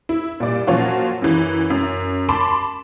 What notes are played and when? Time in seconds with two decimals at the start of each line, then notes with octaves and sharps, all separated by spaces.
0.09 E4
0.40 A#2 G3 D5
0.67 A#2 F3 F#3 C#4 F4 F#4
1.22 F#2 E3
1.70 F#2
2.29 A5 B5 C6 D6